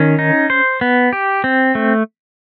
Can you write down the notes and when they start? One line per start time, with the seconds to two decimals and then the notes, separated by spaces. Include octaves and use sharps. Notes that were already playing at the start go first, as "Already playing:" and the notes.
Already playing: D#3 C#4
0.19 D#4
0.50 C5
0.81 B3
1.13 G4
1.44 C4
1.75 A3